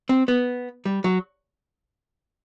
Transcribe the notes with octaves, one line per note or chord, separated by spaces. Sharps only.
C4
B3
G3
F#3